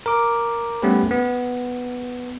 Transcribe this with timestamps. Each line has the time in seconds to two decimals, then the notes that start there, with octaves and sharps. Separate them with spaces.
0.06 A#4 D6
0.82 G3 A3 B3 C#4 G4 B4
1.11 B3